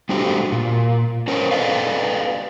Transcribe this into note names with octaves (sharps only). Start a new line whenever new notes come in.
G3 A3 D4 F#4 G4 C5
A#2
C#4 A#4 C5 C#5
A4 B4 D5 D#5 F5